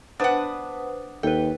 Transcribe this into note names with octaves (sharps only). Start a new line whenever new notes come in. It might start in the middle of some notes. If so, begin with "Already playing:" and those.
B3 D4 B4 C5 F#5 D#6
D#2 A4 B4 G5